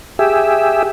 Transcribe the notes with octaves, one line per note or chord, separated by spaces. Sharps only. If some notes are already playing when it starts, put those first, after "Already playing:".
G4 G#4 E5